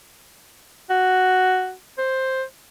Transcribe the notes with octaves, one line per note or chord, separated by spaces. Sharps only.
F#4
C5